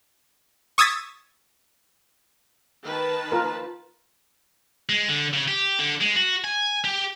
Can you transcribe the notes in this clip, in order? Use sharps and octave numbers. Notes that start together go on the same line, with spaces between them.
C#6 D#6 E6 G#6 A6 B6
D#3 B4 A5
F4 A#4
G#3
D3
C#3
G4
D3
G#3
F#4
G#5
G4